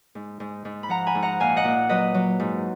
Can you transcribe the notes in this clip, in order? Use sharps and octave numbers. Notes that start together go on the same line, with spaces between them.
G#2
G#2
G#2
B5
F3 F#5 A#5
G#5 B5
G#2
F#5 A#5
A#2 F5 G#5
D#5 F#5
A#2
F#3 B4 D#5
F#3
G#2